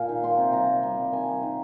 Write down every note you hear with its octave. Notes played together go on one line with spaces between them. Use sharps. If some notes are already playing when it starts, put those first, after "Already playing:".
Already playing: A#2 F5 G#5
D#3
A#3 C6
C3
G3 A#5
A#3
G3
C3
D#3 G#5
G3
D#3